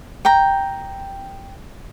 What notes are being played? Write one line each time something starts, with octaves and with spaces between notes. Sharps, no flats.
G5 A#5